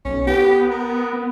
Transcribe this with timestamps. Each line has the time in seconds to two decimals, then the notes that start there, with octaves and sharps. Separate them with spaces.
0.05 B1 C#4
0.27 B3 G4
0.71 A#4
1.13 B3